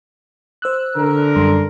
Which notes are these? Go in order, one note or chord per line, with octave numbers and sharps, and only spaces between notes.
C5 E6 F#6
D3 A#4
F#2 G3 C6